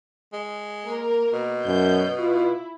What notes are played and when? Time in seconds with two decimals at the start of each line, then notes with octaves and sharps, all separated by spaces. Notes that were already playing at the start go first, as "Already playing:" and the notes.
0.33 G#3
0.84 A#3 A#4
1.33 B2
1.66 F#2 G6
2.19 E4 F4